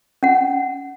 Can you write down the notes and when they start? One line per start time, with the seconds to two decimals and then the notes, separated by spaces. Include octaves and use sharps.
0.23 C#4 F#5